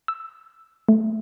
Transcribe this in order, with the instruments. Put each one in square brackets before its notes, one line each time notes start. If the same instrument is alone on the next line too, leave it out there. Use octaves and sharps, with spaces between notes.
[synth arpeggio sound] E6
A3